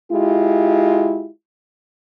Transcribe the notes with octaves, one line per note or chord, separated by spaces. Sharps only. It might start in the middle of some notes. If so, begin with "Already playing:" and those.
G#3 E4 F4 G4